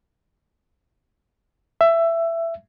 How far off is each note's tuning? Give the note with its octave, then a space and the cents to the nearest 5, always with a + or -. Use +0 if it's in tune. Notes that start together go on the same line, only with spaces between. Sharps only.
E5 +15